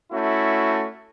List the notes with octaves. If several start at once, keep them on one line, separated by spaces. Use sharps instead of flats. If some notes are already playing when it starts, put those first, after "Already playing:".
A3 C#4 E4 F#4